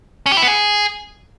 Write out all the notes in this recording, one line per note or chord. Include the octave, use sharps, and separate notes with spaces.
C#4
G4
E4
B3
G#4